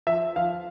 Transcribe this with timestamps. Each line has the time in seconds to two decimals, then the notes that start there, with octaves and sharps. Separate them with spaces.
0.07 F3 E5
0.36 F3 F5